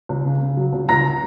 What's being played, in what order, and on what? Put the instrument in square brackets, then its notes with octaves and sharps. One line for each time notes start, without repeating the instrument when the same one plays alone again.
[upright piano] C#2
C#3
C#3
F#3
C#2
C#2 A#5 A#6